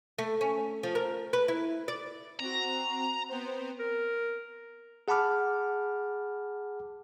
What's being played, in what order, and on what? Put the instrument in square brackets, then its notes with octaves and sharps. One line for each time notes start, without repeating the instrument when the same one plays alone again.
[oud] A3
C#4
F3
A#4
B4
E4
D5
[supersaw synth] C4 F#4 [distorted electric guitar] A#5
[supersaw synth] B3 C4 C5
[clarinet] A#4
[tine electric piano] G#4 F#5 A5 B5 D6 F6